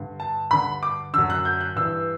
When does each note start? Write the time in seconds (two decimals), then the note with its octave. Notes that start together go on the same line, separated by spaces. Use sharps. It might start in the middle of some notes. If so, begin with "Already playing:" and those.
Already playing: G2 D3
0.20 A5
0.51 G2 D3 B5
0.83 D6
1.13 F#2 D3 E6
1.30 F#6
1.45 G6
1.61 F#6
1.76 G2 E3 E6